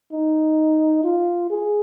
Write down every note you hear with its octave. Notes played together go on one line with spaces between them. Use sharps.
D#4
F4
G#4